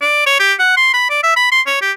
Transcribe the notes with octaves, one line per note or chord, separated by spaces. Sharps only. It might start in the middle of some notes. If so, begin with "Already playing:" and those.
D5
C#5
G4
F#5
C6
B5
D5
E5
B5
C6
C#5
G4